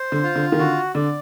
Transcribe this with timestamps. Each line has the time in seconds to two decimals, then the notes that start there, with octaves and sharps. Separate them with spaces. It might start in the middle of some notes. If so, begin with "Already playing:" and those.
Already playing: C5
0.12 D3
0.23 F4
0.36 D3
0.52 D#3
0.59 D3 F#4
0.95 D3 D5